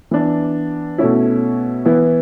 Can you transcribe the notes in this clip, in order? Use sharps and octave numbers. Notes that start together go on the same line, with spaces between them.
E3 B3 D4
B2 A3 C#4 E4
E3 B3 E4